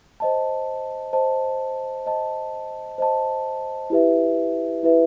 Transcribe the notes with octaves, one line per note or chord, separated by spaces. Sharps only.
C5 D#5 A5
C5 D#5 A5
C5 D#5 A5
C5 D#5 A5
E4 G4 B4 E5
E4 G4 B4 E5